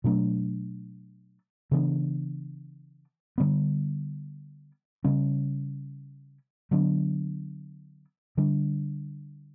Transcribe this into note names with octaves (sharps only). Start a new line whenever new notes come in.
B2 F#3 A3 D4
C#3 E3 B3 D4
D3 G3 B3
C#3 G3 C#4
D3 F#3 B3 D4
D3 G3 D4